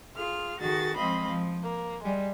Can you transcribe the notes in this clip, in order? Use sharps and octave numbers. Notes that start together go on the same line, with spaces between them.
F4 G#4 F6
D#3 F#4 G#4 A4 A6
F3 G#3 C4 D#5 F5 B5
F3
A#3
G3 G#3